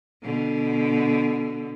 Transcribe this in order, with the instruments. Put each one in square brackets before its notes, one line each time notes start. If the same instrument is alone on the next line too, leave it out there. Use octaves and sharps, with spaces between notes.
[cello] B2 D3